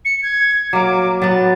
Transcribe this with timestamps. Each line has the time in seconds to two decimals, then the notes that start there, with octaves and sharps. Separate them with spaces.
0.05 C#7
0.22 G#6
0.73 F#3 A#3 D6
1.22 F#3 B3 A6